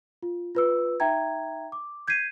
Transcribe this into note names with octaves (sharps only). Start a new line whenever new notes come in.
F4
F4 B4 E6
D#4 E5 G5 A#5 G#6
D6
G6 G#6 B6 C7 D#7